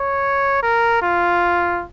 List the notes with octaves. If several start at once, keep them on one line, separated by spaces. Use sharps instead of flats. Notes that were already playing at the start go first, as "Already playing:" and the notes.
Already playing: C#5
A#4
F4